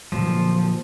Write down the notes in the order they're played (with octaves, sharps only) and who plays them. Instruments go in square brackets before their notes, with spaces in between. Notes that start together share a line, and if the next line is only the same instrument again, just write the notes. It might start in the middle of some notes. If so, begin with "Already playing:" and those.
[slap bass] A#2 D3 F#3 [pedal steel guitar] F3